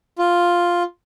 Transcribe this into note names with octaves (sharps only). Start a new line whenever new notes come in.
F4